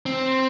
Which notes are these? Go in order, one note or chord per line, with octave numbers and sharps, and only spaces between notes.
C4